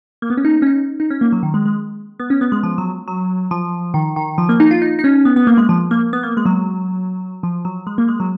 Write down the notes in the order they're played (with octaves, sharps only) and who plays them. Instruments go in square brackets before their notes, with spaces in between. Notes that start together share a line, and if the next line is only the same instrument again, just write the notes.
[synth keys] A#3
B3
C#4
D#4
C#4
D#4
D#4
C#4
A#3
F#3
D#3
G#3
G#3
B3
C#4
B3
G#3
F3
F#3
F#3
F3
D#3
D#3
F3
A#3
D#4
F4
D#4
D#4
C#4
B3
B3
A#3
G#3
F3
A#3
B3
A#3
G#3
F#3
F3
F#3
G#3
A#3
G#3
F#3